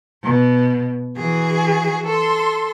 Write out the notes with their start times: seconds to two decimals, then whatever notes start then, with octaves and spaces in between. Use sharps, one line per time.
0.24 B2
1.17 E3 F#4 G#4
2.06 A4 C6